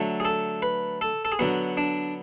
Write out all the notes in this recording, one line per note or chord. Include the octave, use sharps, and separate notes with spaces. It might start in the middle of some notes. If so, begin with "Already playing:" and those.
Already playing: D3 F#3 A3
G#4
A4
B4
A4
A4
G#4
D3 F#3 B3 F#4
D4